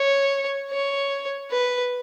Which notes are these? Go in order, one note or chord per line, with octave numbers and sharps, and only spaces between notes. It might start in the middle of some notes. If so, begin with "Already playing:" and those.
Already playing: C#5
C#5
B4